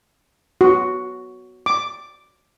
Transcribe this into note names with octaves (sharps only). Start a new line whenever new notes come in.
F#4
D6